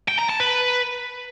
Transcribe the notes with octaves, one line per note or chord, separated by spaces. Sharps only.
G5
A#5
A5
B4